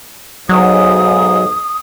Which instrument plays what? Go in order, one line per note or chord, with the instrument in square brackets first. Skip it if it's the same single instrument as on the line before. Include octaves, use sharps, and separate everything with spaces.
[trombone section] B1 G#2 [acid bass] F#3 [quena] D#6